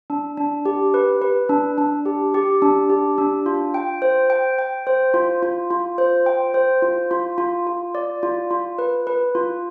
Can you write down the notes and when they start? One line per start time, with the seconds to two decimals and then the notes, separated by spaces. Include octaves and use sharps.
0.10 D4
0.37 D4
0.65 G4
0.94 B4
1.22 B4
1.49 D4
1.78 D4
2.06 G4
2.34 G4
2.62 D4
2.90 G4
3.18 D4
3.46 F4
3.74 G5
4.02 C5
4.30 G5
4.59 G5
4.87 C5
5.14 F4
5.43 F4
5.71 F4
5.98 C5
6.26 G5
6.54 C5
6.82 F4
7.11 F4
7.38 F4
7.67 F4
7.95 D5
8.23 F4
8.51 F4
8.79 B4
9.07 B4
9.35 F4